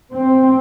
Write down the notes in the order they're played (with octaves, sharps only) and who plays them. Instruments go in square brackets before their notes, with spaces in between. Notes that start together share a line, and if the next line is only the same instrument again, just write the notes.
[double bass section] C4